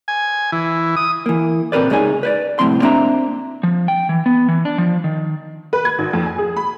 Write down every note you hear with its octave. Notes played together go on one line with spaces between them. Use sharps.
G#5
E3
D#6
E3 A#3
A#2 C4 A#4 B4 D5
C#2 G#3 C#4 D#4 G#5
B4 C5 D5
C2 F2 A2 C#3 C4 C6
A#3 C4 D4 E5 A#5
F3
G5
E3
B3
E3
D4
F3
D#3
B4
G#6
G#1
F2
G#5
G#4
B5